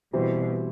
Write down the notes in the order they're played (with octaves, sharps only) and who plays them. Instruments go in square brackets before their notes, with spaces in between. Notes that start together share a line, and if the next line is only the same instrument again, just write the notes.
[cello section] B2 [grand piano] E3 G3 C4